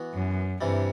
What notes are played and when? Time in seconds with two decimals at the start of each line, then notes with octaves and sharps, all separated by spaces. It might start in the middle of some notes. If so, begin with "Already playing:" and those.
Already playing: E3 B3 F#4
0.13 F#2
0.61 G2 C3 E3 G3